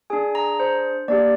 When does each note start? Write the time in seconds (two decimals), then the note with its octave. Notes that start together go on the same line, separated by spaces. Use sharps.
0.10 D4 G#4 G#5
0.35 A#5
0.60 C5
1.08 A#3 D4 G4 D5